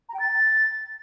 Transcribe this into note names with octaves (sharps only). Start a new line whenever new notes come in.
A#5
G5
A6